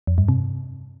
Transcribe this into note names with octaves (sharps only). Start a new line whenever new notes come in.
F2
G2
C3